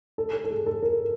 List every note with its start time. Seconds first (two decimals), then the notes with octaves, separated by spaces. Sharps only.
0.18 A4
0.33 A4
0.45 A4
0.51 G#4
0.66 A4
0.82 A#4